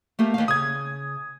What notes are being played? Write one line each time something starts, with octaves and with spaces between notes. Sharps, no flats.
A3 A#3 G4
D#2 F5
C#3 D#6 G#6